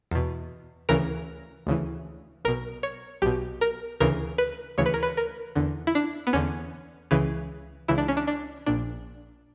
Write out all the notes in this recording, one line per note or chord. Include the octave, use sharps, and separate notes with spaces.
E2 B2
D2 C#3 E3 A#4
D2 C#3 E3
B1 B2 A#4
C#5
B1 B2 G4
A#4
D2 C#3 E3 A#4
B4
D2 C#3 E3 C#5
B4
A#4
B4
A#4
E2 D3
E4
D4
B3
E2 D3 C#4
C#2 C#3 E3
C#2 C#3 E3 E4
D4
C#4
D4
D4
A#1 A#2 D4